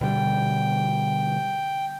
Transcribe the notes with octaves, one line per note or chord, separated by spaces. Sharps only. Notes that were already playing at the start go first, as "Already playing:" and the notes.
B2 D3 G3 G5